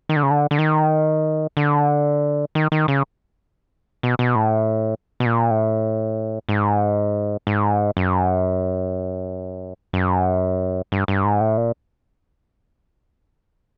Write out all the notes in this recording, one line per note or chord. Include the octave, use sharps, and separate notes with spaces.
D#3
D3
C#3
D3
D3
D#3
D3
D#3
D#3
C#3
B2
B2
A2
B2
A#2
A2
G#2
G#2
F#2
F#2
G2
G2
G#2
A2
A#2